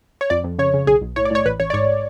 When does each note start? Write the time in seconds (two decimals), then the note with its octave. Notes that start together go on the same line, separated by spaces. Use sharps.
0.21 C#5
0.30 F2 D5
0.44 F2
0.59 C#3 C#5
0.74 C#3
0.87 B1 G#4
1.01 B1
1.16 A2 C#5
1.25 D5
1.31 A2 C#5
1.45 A1 B4
1.60 A1 C#5
1.70 D5
1.74 G#2 C#5